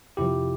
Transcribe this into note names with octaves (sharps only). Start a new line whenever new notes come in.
F2 C3 F3 E4 G4